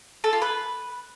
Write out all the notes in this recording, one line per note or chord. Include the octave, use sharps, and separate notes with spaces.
A4
F4
B4